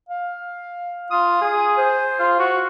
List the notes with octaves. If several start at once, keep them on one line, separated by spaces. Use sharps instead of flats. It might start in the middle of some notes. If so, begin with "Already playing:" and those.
F5
F4 D#6
G#4
C5
F4
F#4 C#6